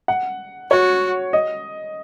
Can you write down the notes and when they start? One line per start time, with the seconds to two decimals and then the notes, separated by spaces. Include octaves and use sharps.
0.08 F#5
0.71 F#4 C#5
1.33 D#5